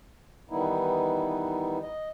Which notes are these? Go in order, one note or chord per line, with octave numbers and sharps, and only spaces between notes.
D#3 E3 G3 B3 D#4 E4
D#5